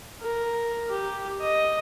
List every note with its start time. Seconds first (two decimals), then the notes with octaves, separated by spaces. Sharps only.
0.22 A#4
0.90 G4
1.41 D#5